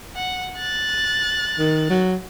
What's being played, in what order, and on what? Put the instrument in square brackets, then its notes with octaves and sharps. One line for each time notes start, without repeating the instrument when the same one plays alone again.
[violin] F#5
F#6 A6
[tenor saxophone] D#3
F#3